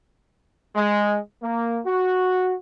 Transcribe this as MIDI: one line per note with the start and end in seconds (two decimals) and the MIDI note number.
0.75 1.18 56
1.43 1.79 58
1.85 2.54 66